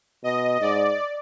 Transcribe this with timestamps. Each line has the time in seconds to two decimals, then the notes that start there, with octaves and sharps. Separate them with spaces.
0.24 B2 D#5
0.61 G#2 D5